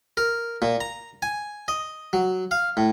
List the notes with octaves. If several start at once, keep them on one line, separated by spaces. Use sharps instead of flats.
A#4
A#2
A#5
G#5
D#5
F#3
F5
A2